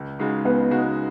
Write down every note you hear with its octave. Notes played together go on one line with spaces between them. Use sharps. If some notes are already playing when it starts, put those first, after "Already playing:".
Already playing: C#2
C#3 G#3 D#4 F#4
C#2 B3
C#3 G#3 D#4 F#4